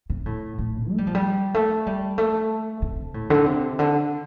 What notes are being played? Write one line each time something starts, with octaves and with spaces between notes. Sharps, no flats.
C3
A2
A2
A3
G3
F3
G3
A3
G3
A3
C3
A2
D3
C3
D3